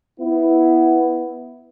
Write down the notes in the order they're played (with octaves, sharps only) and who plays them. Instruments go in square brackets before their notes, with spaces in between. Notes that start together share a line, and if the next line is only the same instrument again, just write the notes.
[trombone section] B3 E4